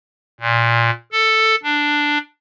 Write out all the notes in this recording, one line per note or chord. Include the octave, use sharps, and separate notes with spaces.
A#2
A4
D4